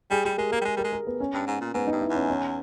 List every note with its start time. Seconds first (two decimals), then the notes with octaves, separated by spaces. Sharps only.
0.11 G3 G#4
0.25 G3 G4
0.38 G#3 A#4
0.51 A#3 A#4
0.61 G3
0.65 G#3 G#4
0.77 G3 A#4
0.84 G#3
0.93 A#4
1.07 B3
1.20 C#4
1.34 G2
1.47 G#2
1.61 A#2
1.74 G#2 B3
1.87 G2 D#4
2.01 E4
2.10 E2
2.15 C#4
2.28 C#4